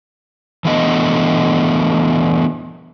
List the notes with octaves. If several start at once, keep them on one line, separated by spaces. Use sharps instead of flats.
E3 A3 B3 D4 D#5